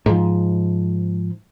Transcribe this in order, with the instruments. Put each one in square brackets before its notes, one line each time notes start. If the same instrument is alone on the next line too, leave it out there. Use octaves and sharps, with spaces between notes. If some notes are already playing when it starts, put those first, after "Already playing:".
[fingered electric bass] G#2 F3